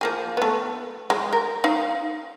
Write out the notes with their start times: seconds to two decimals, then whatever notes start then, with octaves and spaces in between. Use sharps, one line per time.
0.01 F3 A#3 G#4
0.37 A3 B3
1.10 G#3
1.33 A#4
1.64 D#4 F5